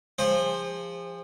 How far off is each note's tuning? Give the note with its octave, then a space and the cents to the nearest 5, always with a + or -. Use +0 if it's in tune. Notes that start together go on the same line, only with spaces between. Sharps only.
F3 -15 G#4 -40 C5 +15